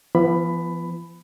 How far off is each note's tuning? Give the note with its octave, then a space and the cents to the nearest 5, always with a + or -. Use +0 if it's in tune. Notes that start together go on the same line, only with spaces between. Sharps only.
F3 -45 B3 +0 B5 +10